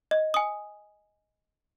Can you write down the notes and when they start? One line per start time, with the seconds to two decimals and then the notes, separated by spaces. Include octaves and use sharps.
0.11 D#5
0.34 G#5 D#6